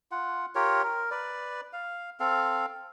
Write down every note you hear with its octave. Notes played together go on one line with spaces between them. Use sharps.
F4 F#5
F4 G4 A#4 C#5
A#4
B4 D5
F5
C4 A4 F5